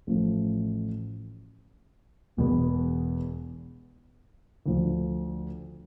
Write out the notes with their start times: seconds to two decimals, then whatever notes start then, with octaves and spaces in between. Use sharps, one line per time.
0.07 A1 A2 F3 A3
2.37 E1 E2 B2 B3
4.66 D2 D3 F3